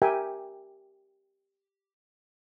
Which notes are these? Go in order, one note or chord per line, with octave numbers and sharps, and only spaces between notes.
G4 A#4 E5 G5 G#5